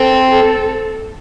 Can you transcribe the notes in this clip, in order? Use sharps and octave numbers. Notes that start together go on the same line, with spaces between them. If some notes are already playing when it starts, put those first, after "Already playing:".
Already playing: C4 A4
A4